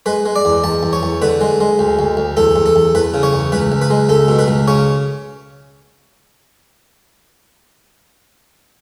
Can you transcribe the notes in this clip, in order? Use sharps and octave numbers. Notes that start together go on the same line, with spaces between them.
G#3 B4
G#3
D5
E2
E2 A5
E2
C#5
E2
D3 B4
G#3
G#3
D2
D2
D2
E2 A4
E2
A4
E2
E2 B4
C#3
C#5
E2
C#2 B4
C#2
B4
G#3
C#2 A4
B2
B4
C#2
C#3 C#5